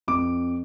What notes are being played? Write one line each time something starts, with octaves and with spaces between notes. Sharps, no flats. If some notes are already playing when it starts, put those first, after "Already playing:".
F2 D6